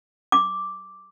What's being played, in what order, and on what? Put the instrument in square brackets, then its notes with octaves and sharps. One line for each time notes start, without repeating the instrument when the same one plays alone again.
[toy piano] D6